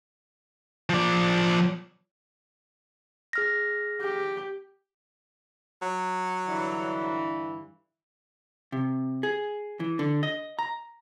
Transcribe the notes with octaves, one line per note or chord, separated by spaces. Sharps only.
F3 D5
G#4 F6 A#6
G4
F#3
G2 D3 E3
C3
G#4
E3
D3
D#5
A#5